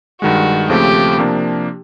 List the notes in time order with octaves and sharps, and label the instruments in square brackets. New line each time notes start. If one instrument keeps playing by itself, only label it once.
[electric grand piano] G2 D#3 G#3 [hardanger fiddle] F#4
[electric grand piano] D#2 C#3 F3 A3 C4 [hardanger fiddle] G4
[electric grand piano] C3 F3 A#3 D4